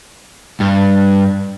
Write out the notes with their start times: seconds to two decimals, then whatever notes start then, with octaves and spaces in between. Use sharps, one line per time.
0.60 G2